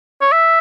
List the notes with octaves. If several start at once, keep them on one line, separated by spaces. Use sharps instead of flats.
C#5
E5